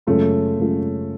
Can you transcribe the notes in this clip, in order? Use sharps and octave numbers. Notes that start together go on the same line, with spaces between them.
F#2 C#3 G#3 A3 C#4 F4
F#2 C#3 G#3 C#4 F4